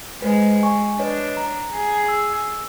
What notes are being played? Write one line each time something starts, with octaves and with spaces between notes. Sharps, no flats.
G#3 B4 C5
G#5 C#6
D4 B4 C#5 D#5
A#5
G#4
E6